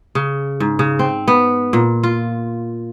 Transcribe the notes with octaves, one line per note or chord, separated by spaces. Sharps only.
C#3
G#2
C#3
C4
B3
A#2
F4